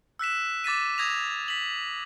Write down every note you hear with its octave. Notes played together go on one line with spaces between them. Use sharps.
E6 F#6 B6 E7
D6 A6 B6 D#7
D#6 G#6 A#6 F7
B6 F#7